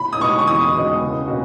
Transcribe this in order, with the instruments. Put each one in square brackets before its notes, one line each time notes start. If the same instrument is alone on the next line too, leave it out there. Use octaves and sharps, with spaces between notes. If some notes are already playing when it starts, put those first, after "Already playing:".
Already playing: [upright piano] B5
D#6
[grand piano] B2 G#3 D#4 F#4 [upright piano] C#6
[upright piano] C#6
[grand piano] E2 [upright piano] D#6
[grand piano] B2 G#3 D#4 F#4
C#2
B2 A#3 C#4 F#4